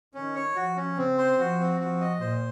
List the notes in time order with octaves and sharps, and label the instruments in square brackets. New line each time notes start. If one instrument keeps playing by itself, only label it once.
[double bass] D#3 [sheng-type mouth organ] C#4
[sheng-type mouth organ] C#5
[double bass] F3 [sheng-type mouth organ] F#4
[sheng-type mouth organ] C#4
[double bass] C#3 [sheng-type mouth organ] C4
[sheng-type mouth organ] C5
[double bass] F3 [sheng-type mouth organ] F#4
[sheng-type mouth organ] C4
[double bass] F3 [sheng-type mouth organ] F#4
[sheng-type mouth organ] D#5
[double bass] A#2 [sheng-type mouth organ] C5